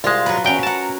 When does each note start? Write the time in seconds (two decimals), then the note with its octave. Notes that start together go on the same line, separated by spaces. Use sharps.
0.04 C2 G#3 F4 A5
0.26 F#3 B4
0.44 E2 F#3 C#4 G5
0.63 A#4 F#5 A5